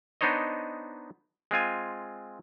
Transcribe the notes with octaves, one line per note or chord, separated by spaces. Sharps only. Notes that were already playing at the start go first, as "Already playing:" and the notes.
B3 D4 D#4 C5 C#5 D#5
G#3 C4 F4 G#5